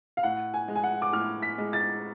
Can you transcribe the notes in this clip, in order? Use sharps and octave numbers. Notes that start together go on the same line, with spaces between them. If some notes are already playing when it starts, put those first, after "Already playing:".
F5
A2 F#5
G#5
G#3
G#5
F#5
D6
A2 F6
B6
G#3
A6